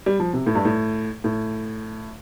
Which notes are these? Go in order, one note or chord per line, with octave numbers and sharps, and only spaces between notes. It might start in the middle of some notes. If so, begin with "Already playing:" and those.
G3
F3
C3
A2
G2
A2
A2